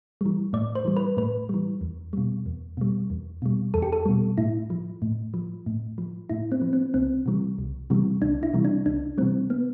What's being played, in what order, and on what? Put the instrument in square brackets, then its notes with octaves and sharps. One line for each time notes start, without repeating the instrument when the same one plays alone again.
[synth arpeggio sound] E3 G3
A2 D5
C5
E3 G3
B4
A2 B4
E3 G3
E2
B2 G3
E2
B2 G3
E2
B2 G3
E2 A4
G4
A4
B2 G3
A2 E4
F3
A2
F3
A2
F3
A2 E4
C4
F3
C4
C2 C4
C3 E3 G3
C2
C3 E3 G3
C2 D4
E4
C3 E3 G3
D4
C2 D4
C3 E3 G3 C4
B3